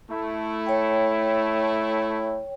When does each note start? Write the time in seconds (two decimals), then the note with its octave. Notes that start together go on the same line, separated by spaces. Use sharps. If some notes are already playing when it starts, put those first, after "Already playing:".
0.10 A3 E4
0.66 C#5 G5